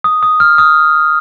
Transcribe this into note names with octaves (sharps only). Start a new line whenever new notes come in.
D#6
D#6
F6
D#6